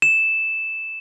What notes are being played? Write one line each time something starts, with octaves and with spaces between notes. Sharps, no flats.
E7